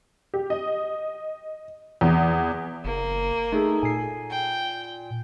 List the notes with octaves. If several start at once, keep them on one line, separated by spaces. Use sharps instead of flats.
G4
D#5
E2
F#1 A#3
A3 D#4 G#4 A4
A#2 G#5 C7
G5